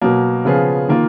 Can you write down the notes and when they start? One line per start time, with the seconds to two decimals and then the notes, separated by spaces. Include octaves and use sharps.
0.01 B2 F#3 A#3
0.45 C#3 F3 B3 F4 G#4
0.88 D#3 A#3 F4